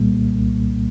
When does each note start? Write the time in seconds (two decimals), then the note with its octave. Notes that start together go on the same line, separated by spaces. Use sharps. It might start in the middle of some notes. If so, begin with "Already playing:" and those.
Already playing: C2 A#2 G3 A#3
0.36 C2